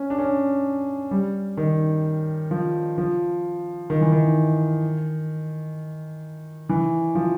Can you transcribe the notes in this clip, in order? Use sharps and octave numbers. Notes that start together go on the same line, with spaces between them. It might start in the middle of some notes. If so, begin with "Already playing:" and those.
Already playing: C#4
D4
C#4
G3
D#3
F3
F3
D#3
E3
D#3
E3
F3